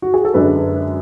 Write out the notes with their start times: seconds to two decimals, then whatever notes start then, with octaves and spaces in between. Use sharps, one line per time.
0.02 F#4
0.14 G#4
0.25 A4
0.34 F#2 D3 G#3 D4 B4